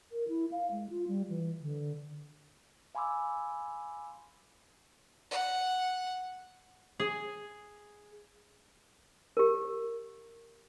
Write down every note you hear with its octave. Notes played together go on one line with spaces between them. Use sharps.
A#4
E4
F5
G#3
F4
G3
E3
D3
F5 G#5 B5 C6 D6 E6
F#5
G#4
G4 A#4